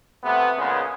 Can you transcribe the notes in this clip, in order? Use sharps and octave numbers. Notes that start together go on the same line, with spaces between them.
C3 A3 B3
A#2 C#3 G#3 B3